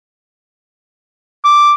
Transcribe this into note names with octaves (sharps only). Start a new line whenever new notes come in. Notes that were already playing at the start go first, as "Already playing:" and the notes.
D6